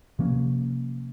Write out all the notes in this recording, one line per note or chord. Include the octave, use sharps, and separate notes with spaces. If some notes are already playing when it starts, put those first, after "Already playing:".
C3 F3 A#3 C#4